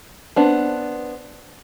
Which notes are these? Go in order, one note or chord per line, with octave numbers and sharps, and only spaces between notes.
B3 C4 D4